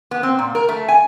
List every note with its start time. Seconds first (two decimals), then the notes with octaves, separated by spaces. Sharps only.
0.11 B3
0.23 C4
0.39 A#2
0.55 A#4
0.69 A3
0.89 G#5